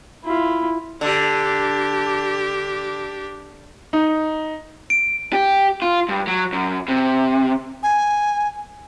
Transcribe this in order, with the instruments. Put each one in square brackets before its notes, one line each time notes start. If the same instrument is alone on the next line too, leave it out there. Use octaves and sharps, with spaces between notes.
[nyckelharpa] E4 F4
[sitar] D3 [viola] D4 G4
[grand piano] D#4
[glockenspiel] D7
[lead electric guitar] G4
F4
G2
F#3
F#2
C3
[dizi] G#5